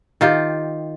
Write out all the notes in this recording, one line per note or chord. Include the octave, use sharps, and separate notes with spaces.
D#3 F4 G4